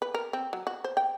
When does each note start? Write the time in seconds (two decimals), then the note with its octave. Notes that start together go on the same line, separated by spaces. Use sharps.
0.02 B4
0.14 A#4
0.33 C4
0.53 F#3
0.67 F#4
0.84 C5
0.97 G5